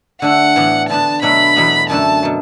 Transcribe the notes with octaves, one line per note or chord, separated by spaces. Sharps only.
D3 A3 D4 F#5
A2 E3 B3 D4
D3 B3 D4 A5
B2 F#3 A3 D4 B5
E2 B2 F#3 B3
F#2 D3 A3 D4 A5
B2 F#3